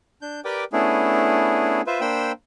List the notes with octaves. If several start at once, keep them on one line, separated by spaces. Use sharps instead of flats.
D4 G6
G4 A#4 B4 D5 G5 D6
A3 B3 C#4 D4 E4 G#4
F4 B4 C5 E5
A#3 D4 C5 G5 B5 E6